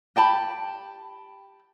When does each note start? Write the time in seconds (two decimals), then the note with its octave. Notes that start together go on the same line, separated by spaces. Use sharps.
0.16 G4 G5 A5 B5